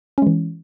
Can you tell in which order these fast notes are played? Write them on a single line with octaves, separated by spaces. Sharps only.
C#4 G#3 E3